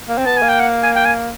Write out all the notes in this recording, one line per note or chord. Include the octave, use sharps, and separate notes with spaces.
A#3
C4
B3 A5
G#5
A#3
G5
F#5
G#5
G5
G#5